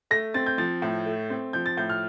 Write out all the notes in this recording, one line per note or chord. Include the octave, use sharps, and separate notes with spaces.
A3 A#6
C4 A6
G6
F3 A6
A2
A3
C4
F3 G6
A6
A2 G6
F6